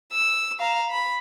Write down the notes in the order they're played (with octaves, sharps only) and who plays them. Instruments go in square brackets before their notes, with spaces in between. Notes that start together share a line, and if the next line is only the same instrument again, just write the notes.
[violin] E6
F5 A#5
B5